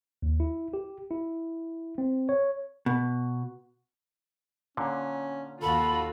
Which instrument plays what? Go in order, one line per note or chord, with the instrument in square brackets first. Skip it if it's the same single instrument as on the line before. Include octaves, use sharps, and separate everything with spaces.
[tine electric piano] D#2
E4
G4
E4
C4
C#5
[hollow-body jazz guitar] B2
[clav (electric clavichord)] A#2 D3 [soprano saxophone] C#4
[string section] D#2 F4 F#4 [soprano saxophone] A4 [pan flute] B5